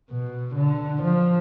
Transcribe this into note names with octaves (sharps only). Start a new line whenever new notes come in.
B2
D3
F3